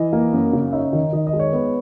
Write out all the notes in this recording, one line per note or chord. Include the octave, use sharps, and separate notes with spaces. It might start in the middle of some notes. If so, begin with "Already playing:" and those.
Already playing: E3 D#5
A#3
F#2
C#3
D#4 C#5 E5
D#3
D#3 D#5
D#5
G#3
C#5
B3